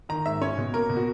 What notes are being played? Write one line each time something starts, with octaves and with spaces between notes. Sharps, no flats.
D#3 A#5
G#2 E5
C#4 C#5
B2
A#3 A#4
B2
F#4